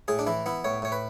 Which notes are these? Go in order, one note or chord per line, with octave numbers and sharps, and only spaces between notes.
A2 G#4
D4
E3 E4
B3 E4
A2 C#5
A2 C#5
B4